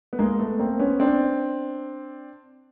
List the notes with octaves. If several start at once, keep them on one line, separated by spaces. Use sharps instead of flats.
B3
G#3 A#3
A3 B3
A#3 C4
B3 C#4
C4 D4